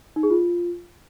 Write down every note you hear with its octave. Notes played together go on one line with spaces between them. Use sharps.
D#4
G#4
F4